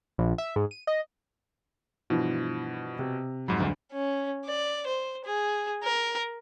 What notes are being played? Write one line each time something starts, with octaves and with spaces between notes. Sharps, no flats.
A#1
E5
G#2
D#7
D#5
G2 B2 E3 F3
C3
F2 G#2 F#3 B5
D2 G2
C#4
D5
C5
G#4
A#4